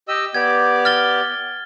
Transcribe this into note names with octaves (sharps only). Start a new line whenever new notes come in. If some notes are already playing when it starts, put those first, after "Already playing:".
G4 D#5 E6
B3 G4 D5 G#6
F6 A6 G7